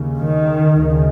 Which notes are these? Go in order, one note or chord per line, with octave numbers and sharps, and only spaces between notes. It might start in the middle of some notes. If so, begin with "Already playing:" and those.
Already playing: D#2 C#3
D#3
D2 C#3